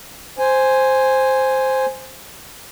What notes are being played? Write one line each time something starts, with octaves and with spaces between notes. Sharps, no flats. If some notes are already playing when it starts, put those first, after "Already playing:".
C5 G#5